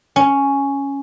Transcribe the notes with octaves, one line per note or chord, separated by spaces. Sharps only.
C#4